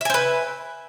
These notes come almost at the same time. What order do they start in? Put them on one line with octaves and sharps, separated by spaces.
E5 G#5 C5 B4